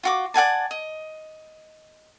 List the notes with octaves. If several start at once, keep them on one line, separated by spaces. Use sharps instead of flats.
F4 F#4 D6
D5 F#5 G#5 A5
D#5